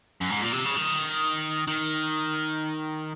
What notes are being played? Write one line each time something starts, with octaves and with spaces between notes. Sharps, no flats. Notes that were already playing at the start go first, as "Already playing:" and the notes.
F#2
G#2
A#2
C3
C#3
D#3
D#3